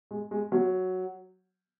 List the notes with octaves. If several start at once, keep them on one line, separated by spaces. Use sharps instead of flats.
G#3
G#3
F#3